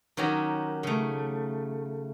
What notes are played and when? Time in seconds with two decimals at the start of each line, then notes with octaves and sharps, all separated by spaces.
0.17 D#3 F#3 C#4 G4 A#4
0.83 C#3 A3